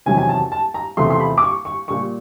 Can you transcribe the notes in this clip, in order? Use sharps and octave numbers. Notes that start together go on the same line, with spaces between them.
E2 C3 D#3 F#3 G#5
G#5
A5
A5
A#5
E2 C3 F3 A3 C6
C6
B5
D6
C#6
C#6
A#2 G3 C#6